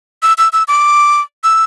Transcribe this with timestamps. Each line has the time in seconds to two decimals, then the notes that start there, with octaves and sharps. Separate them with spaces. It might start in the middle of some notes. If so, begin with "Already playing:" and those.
0.23 E6
0.38 E6
0.53 E6
0.68 D6
1.44 E6